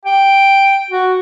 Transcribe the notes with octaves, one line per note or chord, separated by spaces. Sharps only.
G5
F#4